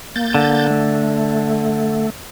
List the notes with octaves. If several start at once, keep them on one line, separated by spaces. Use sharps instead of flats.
A#3 G6 A6
D3
A3